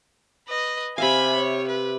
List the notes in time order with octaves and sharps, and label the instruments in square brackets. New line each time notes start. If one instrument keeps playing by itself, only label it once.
[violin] B4 D#5
[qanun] C3 E5 F5 [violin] G#5 B5
[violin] C#5
B4